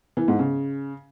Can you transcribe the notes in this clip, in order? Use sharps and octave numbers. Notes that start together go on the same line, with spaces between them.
E3
G#2
C#3